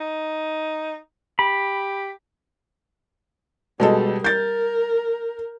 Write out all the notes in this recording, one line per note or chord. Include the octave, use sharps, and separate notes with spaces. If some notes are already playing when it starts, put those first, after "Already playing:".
D#4
G4 B5
B2 G3 G#3 A4
A#4 G6 A6